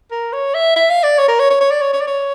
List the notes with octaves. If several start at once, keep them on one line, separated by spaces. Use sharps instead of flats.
A#4
C#5
E5
E5
F5
D5
C#5
A#4
C#5
C#5
C#5
D5
C#5
C#5
D5
C#5